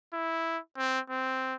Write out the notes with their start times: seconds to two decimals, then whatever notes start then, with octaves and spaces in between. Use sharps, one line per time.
0.13 E4
0.77 C4
1.10 C4